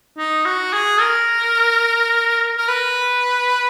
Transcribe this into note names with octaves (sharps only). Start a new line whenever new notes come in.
D#4
F#4
G#4
A#4
A#4
B4